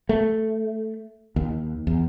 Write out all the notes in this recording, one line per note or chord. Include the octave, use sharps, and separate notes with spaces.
A3
D#2
E2